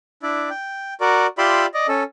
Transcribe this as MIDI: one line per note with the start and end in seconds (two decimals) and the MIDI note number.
0.23 0.50 62
0.23 0.50 64
0.23 0.50 74
0.50 0.94 79
1.01 1.27 66
1.01 1.27 70
1.01 1.27 74
1.38 1.66 65
1.38 1.66 67
1.38 1.66 74
1.38 1.66 76
1.38 1.66 83
1.38 1.66 84
1.74 1.87 74
1.74 1.87 75
1.88 2.03 61
1.88 2.03 69